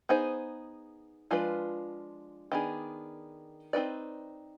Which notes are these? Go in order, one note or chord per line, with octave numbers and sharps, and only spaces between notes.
B3 D#4 G#4 C5
F3 G#3 D4 F4 B4
D#3 B3 D4 G#4
C4 D#4 B4 D5